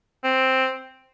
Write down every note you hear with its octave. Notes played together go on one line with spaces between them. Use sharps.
C4